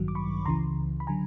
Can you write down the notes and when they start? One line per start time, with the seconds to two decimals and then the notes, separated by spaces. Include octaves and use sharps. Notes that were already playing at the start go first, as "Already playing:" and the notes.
Already playing: A1 G2 D#3 F#3
0.08 D6
0.15 B5 C#6
0.45 C#2 C#3 E3 A#5 C6
1.00 B5
1.07 D3 F#3 G#5 A#5